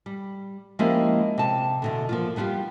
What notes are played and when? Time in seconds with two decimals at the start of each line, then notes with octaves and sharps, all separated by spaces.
0.06 G3
0.79 F3 G#3 A#3 C#4 E4 G4
1.38 C3 A5
1.82 E2 B2 D3
2.09 F3 A#3 F4
2.36 G3 B3 D#4 F4 G4